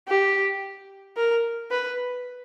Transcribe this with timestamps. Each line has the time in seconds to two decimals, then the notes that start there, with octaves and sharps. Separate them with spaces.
0.08 G4
1.17 A#4
1.71 B4